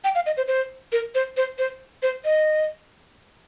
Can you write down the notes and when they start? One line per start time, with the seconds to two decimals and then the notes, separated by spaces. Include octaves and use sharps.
0.04 G5
0.15 F5
0.26 D#5
0.37 C5
0.48 C5
0.92 A#4
1.15 C5
1.37 C5
1.58 C5
2.03 C5
2.25 D#5